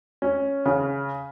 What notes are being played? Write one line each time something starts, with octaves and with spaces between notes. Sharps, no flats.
C#4
C#3